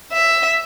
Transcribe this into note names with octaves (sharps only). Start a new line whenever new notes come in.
E5